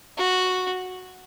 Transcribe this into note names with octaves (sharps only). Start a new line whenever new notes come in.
F#4